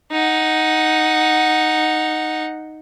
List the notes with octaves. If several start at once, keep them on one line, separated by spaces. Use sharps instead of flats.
D#4 F#5